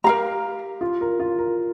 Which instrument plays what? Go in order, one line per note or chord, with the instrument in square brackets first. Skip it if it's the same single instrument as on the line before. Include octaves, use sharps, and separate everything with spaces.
[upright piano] G4 [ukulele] A#4 F5 A#5
[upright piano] F4
A#4
F4
A#4